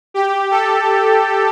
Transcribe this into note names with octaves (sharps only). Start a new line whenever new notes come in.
G4
A4